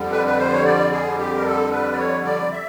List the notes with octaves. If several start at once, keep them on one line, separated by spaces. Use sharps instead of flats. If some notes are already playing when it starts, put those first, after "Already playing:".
Already playing: F2 D3 G3
B4
B4
C5
C#5
D5
G#4
G4
A#4
A4
B4
D5
C#5
D5
E5